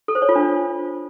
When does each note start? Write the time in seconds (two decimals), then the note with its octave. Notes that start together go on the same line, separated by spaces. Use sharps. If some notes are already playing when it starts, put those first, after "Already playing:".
0.08 A4
0.15 C5
0.22 C#5
0.29 F4
0.36 D4